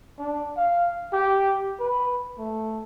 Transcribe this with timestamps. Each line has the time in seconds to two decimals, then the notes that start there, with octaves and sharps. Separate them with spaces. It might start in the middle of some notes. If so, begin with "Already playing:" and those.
0.19 D4
0.57 F5
1.13 G4
1.79 B4
2.38 A3